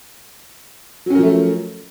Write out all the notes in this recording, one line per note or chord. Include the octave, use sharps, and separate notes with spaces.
F3 F#3 A3 C#4 A#4